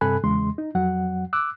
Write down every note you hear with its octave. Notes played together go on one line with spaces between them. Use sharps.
G2 C3 A4 G#5 B5 F#6
E2 C#3 G#3 C6
D#4
F2 F#3 F#5
D6 E6 F#6